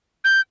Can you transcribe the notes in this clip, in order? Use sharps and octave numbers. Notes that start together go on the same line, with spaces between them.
G6